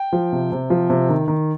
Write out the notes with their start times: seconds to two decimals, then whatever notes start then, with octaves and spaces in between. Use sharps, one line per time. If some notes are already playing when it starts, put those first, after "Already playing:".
Already playing: G5
0.13 F3
0.32 C3
0.52 C3
0.70 F3
0.90 C3
1.09 D#3
1.28 D#3